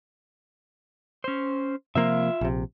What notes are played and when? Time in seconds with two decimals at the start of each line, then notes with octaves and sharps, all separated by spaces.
1.24 C#4 C5
1.95 C3 F3 A#3 F4 E5
2.41 A#1 C3